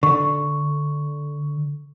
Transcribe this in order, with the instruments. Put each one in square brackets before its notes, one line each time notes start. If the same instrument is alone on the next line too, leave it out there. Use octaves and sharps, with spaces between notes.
[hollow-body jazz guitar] D3 [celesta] C#6